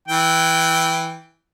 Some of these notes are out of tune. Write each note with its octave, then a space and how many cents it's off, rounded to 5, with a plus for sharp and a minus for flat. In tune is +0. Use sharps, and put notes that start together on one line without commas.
E3 +0 G5 +0